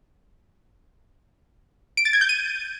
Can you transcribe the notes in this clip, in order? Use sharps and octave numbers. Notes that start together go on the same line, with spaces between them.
D7
A6
G#6
G6
D#7